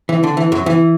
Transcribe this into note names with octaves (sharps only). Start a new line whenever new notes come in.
E3
D3
E3
F#2 F#3
E3